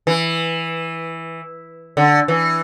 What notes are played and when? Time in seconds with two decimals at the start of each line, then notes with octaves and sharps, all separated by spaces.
0.07 E3
1.97 D3
2.28 E3